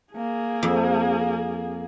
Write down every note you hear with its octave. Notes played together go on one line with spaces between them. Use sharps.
A#3 G#4
F2